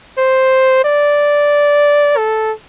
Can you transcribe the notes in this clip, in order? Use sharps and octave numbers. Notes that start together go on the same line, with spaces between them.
C5
D5
A4